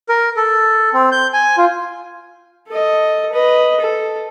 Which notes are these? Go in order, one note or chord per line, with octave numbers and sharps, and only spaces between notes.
A#4
A4
C4
G6
G#5
F4
A4 D#5
B4 D#5
A4